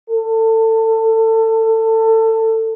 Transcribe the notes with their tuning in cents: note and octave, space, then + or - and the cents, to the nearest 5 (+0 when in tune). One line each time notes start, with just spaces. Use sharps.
A4 +25